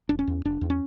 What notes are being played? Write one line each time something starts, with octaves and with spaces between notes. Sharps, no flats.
E1 D4
C#4
E2
F1 D4
E2
C#4